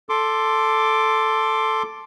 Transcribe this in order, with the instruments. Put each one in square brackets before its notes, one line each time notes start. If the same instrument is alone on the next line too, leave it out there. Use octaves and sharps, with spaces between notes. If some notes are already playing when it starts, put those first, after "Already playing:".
[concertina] A4 C6 D6